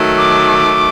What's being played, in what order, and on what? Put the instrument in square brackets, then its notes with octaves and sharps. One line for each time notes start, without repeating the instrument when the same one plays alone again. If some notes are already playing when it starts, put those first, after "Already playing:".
Already playing: [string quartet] D#3 F#3 A3
[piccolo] D6